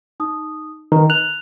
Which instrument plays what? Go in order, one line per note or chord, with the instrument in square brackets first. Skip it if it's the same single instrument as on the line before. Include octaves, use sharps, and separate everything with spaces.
[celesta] D#4 D#6
[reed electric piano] D#3 [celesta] B4 A#5
[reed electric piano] F#6 [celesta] F7